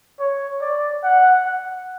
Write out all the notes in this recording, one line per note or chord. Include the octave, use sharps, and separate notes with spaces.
C#5
D5
F#5
F#5